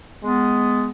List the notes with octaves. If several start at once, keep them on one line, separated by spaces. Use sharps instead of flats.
G#3 B3